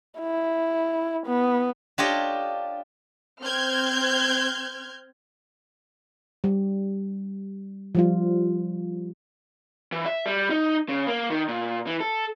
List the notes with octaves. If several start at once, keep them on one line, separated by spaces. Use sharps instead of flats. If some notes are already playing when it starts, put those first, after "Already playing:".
E4
B3
D4 F4 G4 A4 C#5 D#5
C4 F6 G6 G#6
G3
F3 G3 F4
E3
E5
G3
D#4
C#3
A#3
D#3
A#2
E3
A4